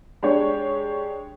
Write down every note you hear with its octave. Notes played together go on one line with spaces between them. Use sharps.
G#3 D4 G4 C#5